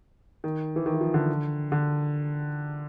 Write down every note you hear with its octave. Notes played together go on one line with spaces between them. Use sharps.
D#3
E3
D#3
E3
F3
D3
D3